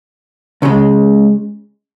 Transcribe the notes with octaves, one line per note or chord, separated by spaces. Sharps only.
C#2 C#3 G#3